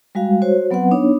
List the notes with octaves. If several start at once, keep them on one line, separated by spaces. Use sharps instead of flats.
G3 G#3 F#4 F5
F#4 C5 C#5
F#3 B3 C4 B4 F#5
B3 D4 D#4 C#5